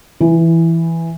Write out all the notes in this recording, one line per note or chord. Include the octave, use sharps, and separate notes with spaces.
E3